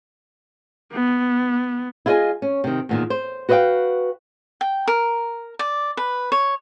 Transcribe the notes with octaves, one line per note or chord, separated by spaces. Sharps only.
B3
E4 F4 G#4 A#4 D#5 G#5
C#4
C3 D#3
E2 A#2 D#3
C5
F#4 B4 C5 D#5 F5 G5
G5
A#4
D5
B4
C#5